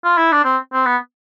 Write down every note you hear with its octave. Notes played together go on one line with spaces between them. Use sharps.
F4
E4
D4
C4
C4
B3